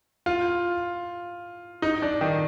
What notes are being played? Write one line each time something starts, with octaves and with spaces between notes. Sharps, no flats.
F4
D#4
D4
D#3